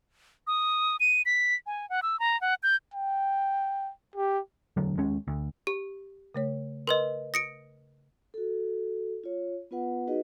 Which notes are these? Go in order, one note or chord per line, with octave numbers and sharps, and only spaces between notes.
D#6
D#7
B6
G#5
F#5
E6
A#5
F#5
G6
G5
G4
E1 D2 D3 F#3
D#2 G#3 C#4
D2
G4
C#3 A3 C#5
A#4 B4 D#5 C6
D#6 A#6 C#7 D7
F#4 A4
F4 C#5
B3 F4 B4 F#5
D#4 F#4 G#4 B4 D#5